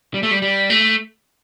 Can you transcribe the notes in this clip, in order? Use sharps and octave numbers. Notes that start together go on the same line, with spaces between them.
G3
A3
G3
G3
A3